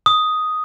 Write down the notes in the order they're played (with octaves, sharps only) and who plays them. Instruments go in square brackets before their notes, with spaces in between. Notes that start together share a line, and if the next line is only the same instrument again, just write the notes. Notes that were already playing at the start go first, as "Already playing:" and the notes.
[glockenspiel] D#6